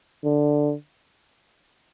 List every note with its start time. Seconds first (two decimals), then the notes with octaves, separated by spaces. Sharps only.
0.24 D3